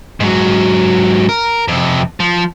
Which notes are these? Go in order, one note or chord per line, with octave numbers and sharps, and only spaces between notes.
G#2 F#3
A#4
F2 C3
F3